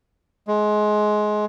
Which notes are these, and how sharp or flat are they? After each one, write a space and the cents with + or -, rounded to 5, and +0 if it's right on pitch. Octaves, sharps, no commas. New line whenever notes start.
G#3 +20